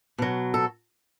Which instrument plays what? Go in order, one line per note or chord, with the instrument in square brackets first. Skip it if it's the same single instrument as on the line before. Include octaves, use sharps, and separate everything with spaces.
[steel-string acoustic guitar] B2 F#3
A4